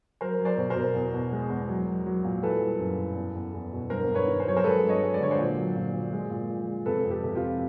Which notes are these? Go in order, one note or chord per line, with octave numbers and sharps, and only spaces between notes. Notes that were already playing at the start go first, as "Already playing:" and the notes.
F#3 A#4 C5
F#3
C5 D5
B2
A#4 C5
B2
E2
B2
G#3
E2
F#3
F#3
F#3
A#2
E3 A4 B4
G3
F#2
E3
E2
E2
E2
B2
G2 A#4 C5
G2
B4 C#5
D#3
C5
F#3 C#5
A#4 C5
G#3 A4 B4
G2
C#5 D#5
G#3
D5
D3 C#5
C5 D5
A#2
F#3
A#2
A#2
G#3
A#2
F3
G#3
C3 A4 B4
F2
G4 A4
C3
F4 G4
F3